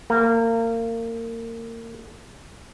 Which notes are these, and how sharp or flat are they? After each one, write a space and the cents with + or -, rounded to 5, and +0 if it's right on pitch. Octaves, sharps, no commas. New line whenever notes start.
A#3 -30